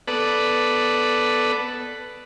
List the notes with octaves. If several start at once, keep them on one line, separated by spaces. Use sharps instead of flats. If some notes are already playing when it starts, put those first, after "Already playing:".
B3 A4 B4 D5